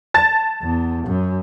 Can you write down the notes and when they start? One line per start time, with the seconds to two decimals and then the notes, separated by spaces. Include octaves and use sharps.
0.14 A5 A6
0.62 E2
1.06 F#2